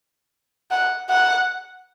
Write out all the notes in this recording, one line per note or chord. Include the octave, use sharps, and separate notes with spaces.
F#5
F#5